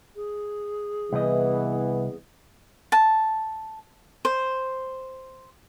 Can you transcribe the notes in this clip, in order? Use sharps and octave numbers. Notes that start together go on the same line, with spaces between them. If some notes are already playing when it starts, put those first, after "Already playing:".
G#4
C2 E3 B3 D#5
A5
C5